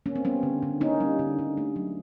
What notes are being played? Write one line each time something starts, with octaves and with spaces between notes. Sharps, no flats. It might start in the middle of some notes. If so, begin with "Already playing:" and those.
A#3 C#4
C4
G3 B3 C#4
D3
D3
A#3 C#4 D#4
G3
D3
D3
A3
F#3